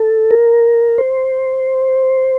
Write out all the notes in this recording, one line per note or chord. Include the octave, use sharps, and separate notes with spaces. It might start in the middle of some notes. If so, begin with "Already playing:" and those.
Already playing: A4
A#4
C5